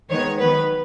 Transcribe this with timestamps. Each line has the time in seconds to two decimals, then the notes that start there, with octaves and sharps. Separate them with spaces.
0.10 D#3 G#3 B3 C#5
0.39 D#3 F#3 B3 B4